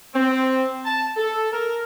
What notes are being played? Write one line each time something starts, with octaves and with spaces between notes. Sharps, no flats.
C4
A5
A4
A#4